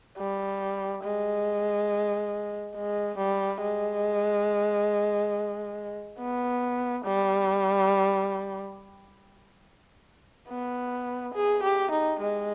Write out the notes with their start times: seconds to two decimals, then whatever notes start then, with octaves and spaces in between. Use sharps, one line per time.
0.17 G3
1.03 G#3
2.76 G#3
3.18 G3
3.61 G#3
6.19 B3
7.05 G3
10.49 B3
11.34 G#4
11.63 G4
11.91 D#4
12.20 G#3